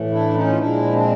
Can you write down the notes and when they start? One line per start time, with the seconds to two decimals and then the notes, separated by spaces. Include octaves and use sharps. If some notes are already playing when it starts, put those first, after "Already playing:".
Already playing: A2 E3 A3
0.10 D4 E4
0.34 C#4 D#4
0.47 F4
0.57 A#2 F3 G#3 D4 E4
0.93 C4 D4